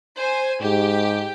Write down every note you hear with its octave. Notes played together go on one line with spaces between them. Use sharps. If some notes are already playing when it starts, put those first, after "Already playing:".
C5 G#5
G#2 G4